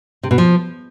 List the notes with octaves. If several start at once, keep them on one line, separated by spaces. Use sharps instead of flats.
C3
B2
F3